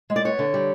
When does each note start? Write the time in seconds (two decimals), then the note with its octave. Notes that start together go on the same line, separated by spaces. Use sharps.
0.10 G#3
0.16 D5
0.25 B3 C#5
0.39 D3
0.54 G3